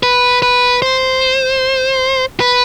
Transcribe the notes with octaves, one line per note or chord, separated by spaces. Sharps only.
B4
B4
C5
B4